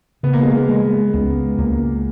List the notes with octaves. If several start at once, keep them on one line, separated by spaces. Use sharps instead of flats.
C#3 B3
A#3
G#3
A#3
G#3
C#2 B3
C#2 A#3